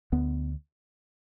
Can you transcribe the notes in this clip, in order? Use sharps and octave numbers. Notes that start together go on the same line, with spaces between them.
D2 B3